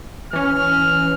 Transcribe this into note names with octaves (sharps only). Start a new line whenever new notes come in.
E3 C#4 F6